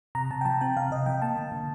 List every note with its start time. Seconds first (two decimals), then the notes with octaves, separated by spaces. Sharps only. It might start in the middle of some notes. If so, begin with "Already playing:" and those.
0.15 C3 A#5
0.31 C3 A5
0.41 G5
0.45 F3 A5
0.61 C4 G5
0.77 C3 F5
0.91 C3 D#5
1.06 F3 G5
1.22 A#3 A5
1.36 D3
1.52 D3